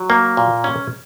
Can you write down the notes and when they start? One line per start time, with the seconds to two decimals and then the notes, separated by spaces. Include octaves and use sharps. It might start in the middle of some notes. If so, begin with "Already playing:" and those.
Already playing: F#3
0.10 A#3
0.37 A#2
0.64 C#4